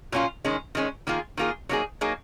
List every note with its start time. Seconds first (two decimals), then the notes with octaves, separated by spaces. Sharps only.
0.12 A#2 F#3 A#3 C#4 F4
0.45 D#3 G#3 C#4
0.75 D#3 G#3 C#4
1.07 D#3 A#3 F4 G#4
1.37 D#3 A#3 F4 G#4
1.69 F#3 A#3 D#4 G#4
2.01 F#3 A#3 D#4 G#4